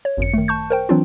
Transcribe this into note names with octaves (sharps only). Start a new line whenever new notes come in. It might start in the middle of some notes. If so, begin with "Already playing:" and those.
C#5
G#1 F#2 C#7
D#3 A3
A5 C#6 G6
A#4 C5 G5
E3 F#3 C4 D4 F4